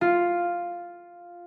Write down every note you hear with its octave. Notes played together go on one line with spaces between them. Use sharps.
F4